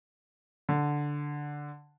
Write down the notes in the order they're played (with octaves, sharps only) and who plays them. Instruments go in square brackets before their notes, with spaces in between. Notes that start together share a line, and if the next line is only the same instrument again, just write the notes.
[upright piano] D3